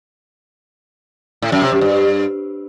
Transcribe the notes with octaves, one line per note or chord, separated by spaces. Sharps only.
A2
F#2
C3
F#2
G2